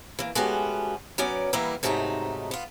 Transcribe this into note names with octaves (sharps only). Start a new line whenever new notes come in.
E3 A#3
G#3 A3 B3 C#4 F#4 G4
F#3 B3 C#4 A#4 D5
E3 G3 A#3 B3 E4 A#4
G#2 C3 F#3 A3 C4 D#4
B3 F4